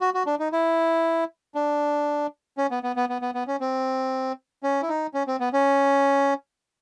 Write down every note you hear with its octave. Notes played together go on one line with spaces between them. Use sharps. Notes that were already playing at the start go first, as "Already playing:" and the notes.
F#4
F#4
D4
D#4
E4
D4
C#4
B3
B3
B3
B3
B3
B3
C#4
C4
C#4
E4
D#4
C#4
C4
B3
C#4